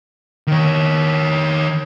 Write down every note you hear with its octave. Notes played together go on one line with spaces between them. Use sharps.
D#3 C#5